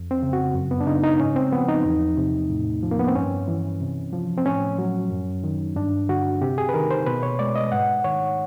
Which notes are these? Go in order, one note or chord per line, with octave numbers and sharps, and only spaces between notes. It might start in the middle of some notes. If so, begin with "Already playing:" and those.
Already playing: F2
C4
C#3
F#4
F#2
B3
D4
C#3 D#4
D#4
G#2 C#4
C4
F3 B3
D#4
E2
C3
A2
F3
A#3
B3
C4
G2 C#4
E3
C3
F3
C4
A2 C#4
F#3
F#2
D#3
G2 D4
D3 F#4
C3 G4
G#4
B4
D#3 A#4
C5
B2 B4
C#5
G#3 D5
D#5
G#2 F#5
D#3 C#5